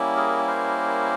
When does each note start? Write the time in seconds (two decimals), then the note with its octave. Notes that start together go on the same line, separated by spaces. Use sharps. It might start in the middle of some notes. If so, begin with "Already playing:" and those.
Already playing: G3 A#3 C#4 E4
0.17 G#4 A#4
0.47 A#4 C5